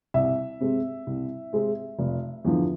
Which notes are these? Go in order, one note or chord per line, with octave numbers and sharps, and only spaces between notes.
C2 E5
C3 G#3 C4
C2
C3 G#3 C4
F1
E2 D3 F3